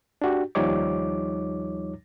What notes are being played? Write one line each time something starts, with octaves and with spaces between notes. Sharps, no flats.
D4 F#4 G4
D#2 F3 G3 D#4 C#5 D6